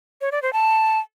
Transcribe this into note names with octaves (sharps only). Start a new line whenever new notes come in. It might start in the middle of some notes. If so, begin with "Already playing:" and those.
C#5
D5
C5
A5